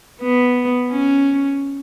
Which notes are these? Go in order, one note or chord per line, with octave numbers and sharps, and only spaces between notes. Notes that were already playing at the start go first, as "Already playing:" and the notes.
B3
C#4